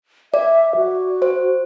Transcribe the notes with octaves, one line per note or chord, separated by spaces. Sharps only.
D5 E5
F#4
C5